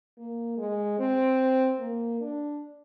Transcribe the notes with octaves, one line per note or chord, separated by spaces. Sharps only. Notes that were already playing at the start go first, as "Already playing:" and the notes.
A#3
G#3
C4
A#3
D4